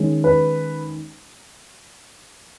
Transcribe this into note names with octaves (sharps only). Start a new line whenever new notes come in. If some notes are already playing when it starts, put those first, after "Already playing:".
Already playing: D#3 G#3 C#4
B4